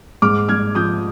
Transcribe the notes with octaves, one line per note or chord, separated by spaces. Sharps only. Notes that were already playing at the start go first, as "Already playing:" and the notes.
G#2 D6 F6
G#2 F6 G#6
F3 D#6 G6